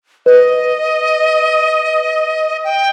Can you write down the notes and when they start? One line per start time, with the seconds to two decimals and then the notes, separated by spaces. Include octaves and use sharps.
0.26 B4 D#5
2.64 G5